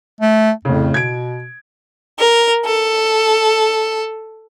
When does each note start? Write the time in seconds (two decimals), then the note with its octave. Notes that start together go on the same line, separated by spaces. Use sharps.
0.21 A3
0.65 F2 A2 C#3
0.94 B2 G#6 D7
2.20 A#4
2.64 A4